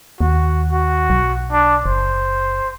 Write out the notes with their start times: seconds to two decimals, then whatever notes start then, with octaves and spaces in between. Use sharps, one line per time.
0.21 D#2 F#4
0.72 F#4
1.10 B1
1.52 D4
1.86 F#1 C5